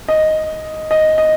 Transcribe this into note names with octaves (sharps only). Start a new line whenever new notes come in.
D#5
D#5
D#5